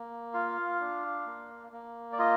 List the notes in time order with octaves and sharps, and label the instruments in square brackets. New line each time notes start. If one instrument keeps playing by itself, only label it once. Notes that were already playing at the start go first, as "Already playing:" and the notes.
Already playing: [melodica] A#3
F4 F5
D4
A#3
A#3
D5
F4 D#5